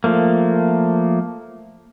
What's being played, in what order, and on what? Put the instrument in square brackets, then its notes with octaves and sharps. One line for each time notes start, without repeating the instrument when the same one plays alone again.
[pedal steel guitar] F3 A3 A#3